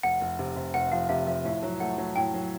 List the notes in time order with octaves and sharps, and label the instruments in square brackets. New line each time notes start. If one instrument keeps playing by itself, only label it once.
[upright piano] F1 [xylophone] F#5
[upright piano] F1
C3
C3
[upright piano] F1 [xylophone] F#5
[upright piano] F3 [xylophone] F5
[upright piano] C3 [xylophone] E5
[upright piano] F3 [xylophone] E5
[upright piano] A2 [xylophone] E5
[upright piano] F#3
[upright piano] A3 [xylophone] F#5
[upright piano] F#3
[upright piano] A2 [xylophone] G5
[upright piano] F#3